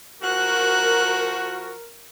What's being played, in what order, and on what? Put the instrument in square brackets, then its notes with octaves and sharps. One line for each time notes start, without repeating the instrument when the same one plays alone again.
[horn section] F3 F#4 [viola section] A#4 [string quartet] F#6